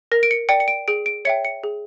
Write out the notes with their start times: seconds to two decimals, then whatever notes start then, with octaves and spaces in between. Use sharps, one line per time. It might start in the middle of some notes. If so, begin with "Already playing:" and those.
0.12 A#4 A#6
0.23 D7
0.31 C#7
0.49 D5 G5 C#7
0.60 C#7
0.68 D7
0.88 G#4 D7
1.06 D7
1.25 C#5 E5 G5 C#7
1.45 C#7
1.64 G#4